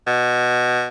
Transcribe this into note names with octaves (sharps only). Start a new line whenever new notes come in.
B2